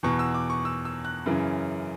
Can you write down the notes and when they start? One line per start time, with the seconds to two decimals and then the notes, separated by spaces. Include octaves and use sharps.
0.03 E2 B2 C#6
0.19 E6
0.34 D6
0.50 C#6
0.65 E6
0.85 E6
1.05 F#6
1.26 F#2 C#3 E3